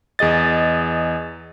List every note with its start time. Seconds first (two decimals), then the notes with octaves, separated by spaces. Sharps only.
0.19 E2 G#4 D#5 A6